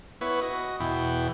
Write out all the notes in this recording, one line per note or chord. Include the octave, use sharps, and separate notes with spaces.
B3 E4 B4 C#5
F#4 D#5
E2 B2 E4 G5